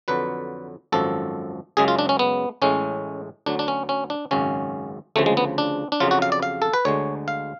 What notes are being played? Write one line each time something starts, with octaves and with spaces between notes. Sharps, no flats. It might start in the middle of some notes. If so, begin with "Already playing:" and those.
F2 D3 F#3 B4
G#1 F#2 F3 A4
F#2 C#3 G#3 G#4
F4
D4
C#4
B3
A1 A2 G#3 C#4
D2 D3 F#3 D4
D4
C#4
C#4
D4
G#1 F#2 C#3 C#4
D2 C#3 F3 A3
G#3
B3
D4
D4
F2 C#3 F#3 F4
F#4
F5
D5
F5
A4
B4
D2 D3 G#3 C#5
F5